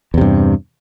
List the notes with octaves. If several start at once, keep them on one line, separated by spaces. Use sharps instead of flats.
E2 G2 C3